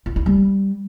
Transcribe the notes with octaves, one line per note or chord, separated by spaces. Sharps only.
F4
E4
G3